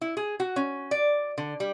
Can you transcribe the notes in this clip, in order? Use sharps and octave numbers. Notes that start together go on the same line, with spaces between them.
E4
G#4
F#4
C#4
D5
D3
G3